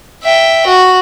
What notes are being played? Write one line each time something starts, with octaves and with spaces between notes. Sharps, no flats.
E5 G5
F#4